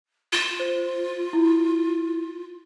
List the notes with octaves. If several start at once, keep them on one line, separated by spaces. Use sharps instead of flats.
F4 E7
C5
E4